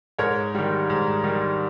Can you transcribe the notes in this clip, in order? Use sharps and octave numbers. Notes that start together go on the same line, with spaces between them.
G#2 A#4 C#5
D#3 G3
G#2
D#3 G3